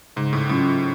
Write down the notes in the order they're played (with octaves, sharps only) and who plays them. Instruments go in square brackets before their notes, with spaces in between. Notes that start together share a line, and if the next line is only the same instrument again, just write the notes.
[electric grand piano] G#2 [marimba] C#3
[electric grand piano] A2
[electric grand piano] A2 [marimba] F#3 C#4 F4